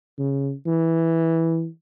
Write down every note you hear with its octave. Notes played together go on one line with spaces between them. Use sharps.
C#3
E3